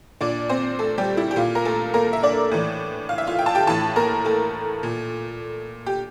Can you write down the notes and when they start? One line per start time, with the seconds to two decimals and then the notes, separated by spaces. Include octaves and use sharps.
0.21 A#2 D4 D5
0.49 C4 C5
0.79 A3 A4
0.98 G3 G4
1.17 E4
1.31 G4
1.36 A#2 F4
1.55 A#4
1.65 A3 A4
1.94 A#3 A#4
2.13 E5
2.23 D4 D5
2.51 A2 E3
3.09 F5
3.18 E5
3.27 F4 F5
3.39 G5
3.46 A5
3.55 G4 G5
3.67 A2 E3 A4 A5
3.96 A#3 A#4
4.25 A3 A4
4.83 A#2
5.86 G4